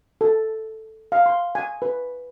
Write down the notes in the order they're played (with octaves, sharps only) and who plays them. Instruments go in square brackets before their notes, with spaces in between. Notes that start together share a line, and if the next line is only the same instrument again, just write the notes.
[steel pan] A4
F5
C6
G#5
B4